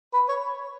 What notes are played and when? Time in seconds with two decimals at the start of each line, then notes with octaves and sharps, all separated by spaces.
0.13 B4
0.28 C#5